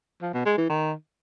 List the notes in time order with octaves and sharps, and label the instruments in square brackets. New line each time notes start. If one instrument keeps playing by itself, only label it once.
[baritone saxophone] F3
B2
G#3
E3
D#3